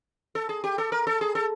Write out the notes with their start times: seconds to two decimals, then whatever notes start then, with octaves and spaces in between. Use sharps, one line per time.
0.35 A4
0.49 G#4
0.64 G4
0.78 A4
0.92 A#4
1.07 A4
1.21 G#4
1.35 A4